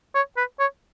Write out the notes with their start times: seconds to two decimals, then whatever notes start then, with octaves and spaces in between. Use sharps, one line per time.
0.15 C#5
0.37 B4
0.60 C#5